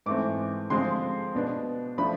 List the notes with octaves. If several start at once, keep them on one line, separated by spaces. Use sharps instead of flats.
G#2 E3 A3 C4 D6
D3 F3 G#3 C4 C6
B2 B3 D4
F3 A3 D4 B5